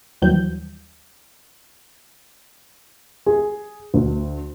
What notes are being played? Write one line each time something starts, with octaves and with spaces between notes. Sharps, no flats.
D#2 E3 F#3 G3 G6
G#4
D2